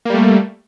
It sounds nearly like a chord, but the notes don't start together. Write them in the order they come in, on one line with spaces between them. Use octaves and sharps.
A#3 G3 A3